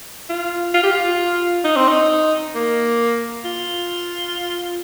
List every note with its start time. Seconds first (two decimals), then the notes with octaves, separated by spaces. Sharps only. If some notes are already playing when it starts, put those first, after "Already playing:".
0.30 F4
0.74 F4
0.84 G4
0.92 F4
1.64 D#4
1.77 C4
1.89 D#4
2.55 A#3
3.45 F4